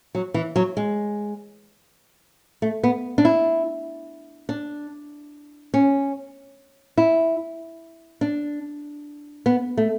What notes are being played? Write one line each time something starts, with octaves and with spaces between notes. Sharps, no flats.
F#3
E3
F#3
G#3
A3
B3
D4
E4
D4
C#4
E4
D4
B3
A3